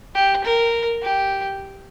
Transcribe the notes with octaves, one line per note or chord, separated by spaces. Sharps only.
G4
A#4
G4